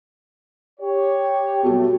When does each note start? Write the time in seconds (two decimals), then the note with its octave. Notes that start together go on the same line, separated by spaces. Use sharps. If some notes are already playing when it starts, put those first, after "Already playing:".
0.80 G4 C#5
1.63 B2 F#3 G3 A3